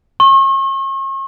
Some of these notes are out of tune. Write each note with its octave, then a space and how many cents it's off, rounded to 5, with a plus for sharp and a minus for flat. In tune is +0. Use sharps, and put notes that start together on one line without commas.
C#6 -40